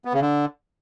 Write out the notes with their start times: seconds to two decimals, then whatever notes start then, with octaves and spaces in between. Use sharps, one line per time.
0.05 B3
0.13 C#3
0.22 D3